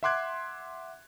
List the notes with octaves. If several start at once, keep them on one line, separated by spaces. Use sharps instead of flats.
E5 F#5 C6 D6 F#6 G#6